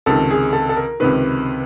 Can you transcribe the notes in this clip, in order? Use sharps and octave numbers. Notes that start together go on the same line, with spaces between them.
C#2 C3 D#3 A4
G#4
A4
A4
A#4
C#2 C3 D#3 B4